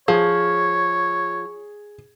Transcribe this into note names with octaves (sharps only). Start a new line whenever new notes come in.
F3 G#4 C#5